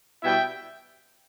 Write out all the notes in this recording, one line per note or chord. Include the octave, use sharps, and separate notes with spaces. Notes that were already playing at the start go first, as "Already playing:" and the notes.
B2 G3 B3 E4 E5 G5